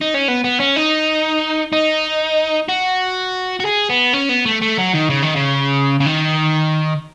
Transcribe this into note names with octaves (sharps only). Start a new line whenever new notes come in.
D#4
C#4
B3
B3
C#4
D#4
D#4
F#4
F#4
G#4
B3
C#4
B3
A3
A3
F#3
D#3
C#3
D#3
C#3
C#3
D#3